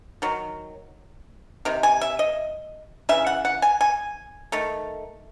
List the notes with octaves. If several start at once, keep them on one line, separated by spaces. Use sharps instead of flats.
D#3 F#3
C3 D#3
G#5
E5
D#5
C#3 E3 E5
F#5
F#5
G#5
G#5
D#3 A3